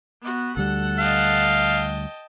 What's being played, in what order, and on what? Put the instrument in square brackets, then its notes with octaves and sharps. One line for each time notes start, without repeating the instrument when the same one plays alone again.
[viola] B3 F#4
[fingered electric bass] D2 G3 [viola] A4 F#5
[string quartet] D#5 G5 A5 [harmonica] F5